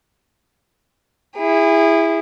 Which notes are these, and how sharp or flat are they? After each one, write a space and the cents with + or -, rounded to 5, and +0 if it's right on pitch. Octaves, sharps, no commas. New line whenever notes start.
E4 +0 G#4 -30